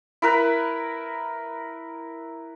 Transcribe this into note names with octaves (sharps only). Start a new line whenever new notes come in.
E4 A#4 B4